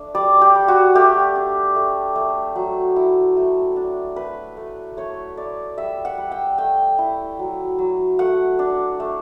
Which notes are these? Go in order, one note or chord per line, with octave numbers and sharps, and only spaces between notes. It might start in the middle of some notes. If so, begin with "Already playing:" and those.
Already playing: A3 D4
G3 D5
G4
G3
F#4
A3 G4
D4
A3
A3
F#3
E4
A3
D4
A3 B4
A3
A3 C#5
A3 D5
G3 E5
F#5
G3
G5
A3 G5
E4
F#3
F#3
A3 F#5
D4
A3